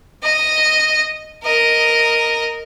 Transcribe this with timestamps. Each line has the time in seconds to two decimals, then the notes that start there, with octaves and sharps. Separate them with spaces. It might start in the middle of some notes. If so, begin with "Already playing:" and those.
0.23 D#5
1.44 A#4 D#5